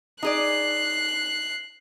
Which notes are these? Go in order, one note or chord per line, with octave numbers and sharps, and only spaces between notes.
D#4 G#4 D5 F#6 C7